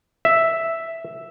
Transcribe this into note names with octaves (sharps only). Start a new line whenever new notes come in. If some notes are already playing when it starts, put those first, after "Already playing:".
E5